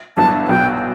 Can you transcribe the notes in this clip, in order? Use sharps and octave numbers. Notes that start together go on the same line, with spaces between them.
G1 G2 F#3 B3 E4 A5
B1 B2 F#3 B3 F#4 G5